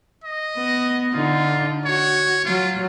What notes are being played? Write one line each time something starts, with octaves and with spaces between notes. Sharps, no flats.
D#5
B3
D3 D#4 F4
F#4 C#5
F#3 F4